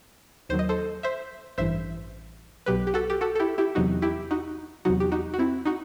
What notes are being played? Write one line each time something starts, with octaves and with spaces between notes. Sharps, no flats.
D#2 D#3 F#3 C5
D#5
A4 C5
C5 E5
A1 G2 E3 C5 E5
B1 B2 F#3 G4 B4
G4
F#4 A4
G4
F#4 A4
A4
E4 G4
E4 G4
E2 C3 F#3 D#4 F#4
E4 G4
D#4 F#4
E2 C3 F#3 D#4 F#4
G4
D#4 F#4
F#4
C4 E4
D#4 F#4